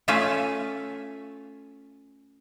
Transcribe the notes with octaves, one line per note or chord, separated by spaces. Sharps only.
A3 C#4 F4 E5 F5 G#5